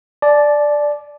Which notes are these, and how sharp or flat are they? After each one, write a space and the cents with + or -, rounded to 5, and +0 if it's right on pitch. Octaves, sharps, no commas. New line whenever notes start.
D5 +0 A5 -35